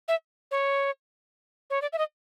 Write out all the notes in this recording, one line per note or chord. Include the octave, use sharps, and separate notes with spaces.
E5
C#5
C#5
D5
E5
D#5